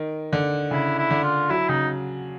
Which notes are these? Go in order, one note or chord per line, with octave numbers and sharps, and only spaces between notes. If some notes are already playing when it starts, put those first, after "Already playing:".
Already playing: D#3
D3
C#3 E4
E4
D3
F4
F#3 E4
C#3 D#4